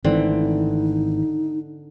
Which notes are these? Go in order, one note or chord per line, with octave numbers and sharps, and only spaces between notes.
G#1 D3 E3 A3 C4 D#4